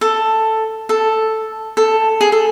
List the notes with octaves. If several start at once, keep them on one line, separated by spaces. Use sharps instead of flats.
A4
A4
A4
G#4
A4